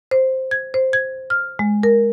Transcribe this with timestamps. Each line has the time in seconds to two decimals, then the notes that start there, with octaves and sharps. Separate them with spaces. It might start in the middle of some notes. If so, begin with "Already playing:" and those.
0.11 C5
0.51 G#6
0.74 C5
0.93 G#6
1.30 F6
1.59 G#3
1.83 A#4